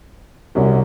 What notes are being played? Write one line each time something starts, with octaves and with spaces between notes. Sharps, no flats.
C2 F#2